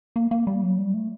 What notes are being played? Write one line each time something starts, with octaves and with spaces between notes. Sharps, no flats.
A#3
A#3
G3
F#3
G3
A3